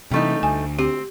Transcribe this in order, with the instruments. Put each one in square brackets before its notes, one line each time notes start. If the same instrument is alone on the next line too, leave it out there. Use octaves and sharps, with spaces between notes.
[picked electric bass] C3 E3 [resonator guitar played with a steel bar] G3 A3 D#4
[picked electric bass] D2 [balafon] G#5
[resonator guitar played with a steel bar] C4 [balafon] G4